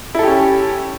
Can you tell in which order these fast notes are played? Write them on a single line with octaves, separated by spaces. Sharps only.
E4 A4 G4 C#4